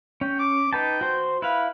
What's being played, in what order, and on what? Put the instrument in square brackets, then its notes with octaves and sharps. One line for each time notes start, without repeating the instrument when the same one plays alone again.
[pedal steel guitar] C#4 [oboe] G5
[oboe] D6
[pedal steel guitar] D#4 B4 A5 [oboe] G5
[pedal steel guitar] F#4 C5
[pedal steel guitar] E4 F5 [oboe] B4